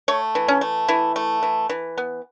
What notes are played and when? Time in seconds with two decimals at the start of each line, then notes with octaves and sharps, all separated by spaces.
0.08 A3 C#5
0.35 E3
0.48 C#4
0.61 A3
0.88 E3 E4
1.16 A3
1.43 E3
1.69 E3
1.98 B3